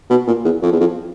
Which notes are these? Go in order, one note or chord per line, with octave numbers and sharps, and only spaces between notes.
B2
A#2
E2
F2
E2
F2